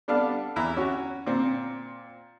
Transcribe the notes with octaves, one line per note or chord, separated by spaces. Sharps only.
G3 B3 D4 A4 F5
E2 E4 A#5
C#4 F#4
A#2 C4